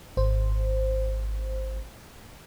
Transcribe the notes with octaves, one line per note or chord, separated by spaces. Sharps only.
G#1 C5